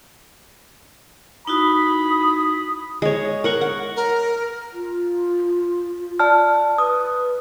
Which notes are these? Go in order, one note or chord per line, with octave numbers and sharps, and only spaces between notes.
D#4 E4 F#4 B5 D#6
G#3 C#5
A#4 F#5 C#6
F#5
A#4
F4
D5 A5 F6
B4 D#6